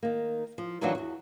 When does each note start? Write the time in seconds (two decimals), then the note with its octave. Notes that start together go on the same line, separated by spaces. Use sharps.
0.03 D#3 A#3
0.58 F3
0.81 D#3 E3 F#3 D4 F4 F#4
0.95 E2 F#4